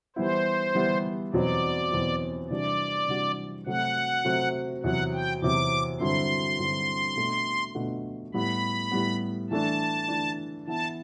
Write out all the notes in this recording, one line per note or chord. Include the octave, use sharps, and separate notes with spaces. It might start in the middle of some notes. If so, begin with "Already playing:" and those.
E3 G3 B3 E4 C5
E3 G3 B3 E4
E2 B2 F#3 C4 D5
E2 B2 F#3 C4
C3 E3 G3 D4 F#4 D5
C3 E3 G3 D4 F#4
C3 F#3 A3 C4 F#4 F#5
C3 F#3 A3 C4 F#4
E2 C3 F#3 F#5
G5
E2 C3 F#3 D6
G2 D3 F#3 C4 E4 C6
G2 D3 F#3 C4 E4
B2 A3 D4 F#4
B2 A3 D4 F#4
A2 G3 B3 B5
A2 G3 B3
E3 A3 D4 A5
E3 A3 D4
E3 B3 E4 A5